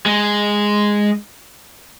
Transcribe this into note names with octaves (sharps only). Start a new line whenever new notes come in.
G#3